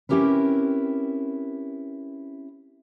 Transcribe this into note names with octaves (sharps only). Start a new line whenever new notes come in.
C4 C#4 E4 G4 A#4 B4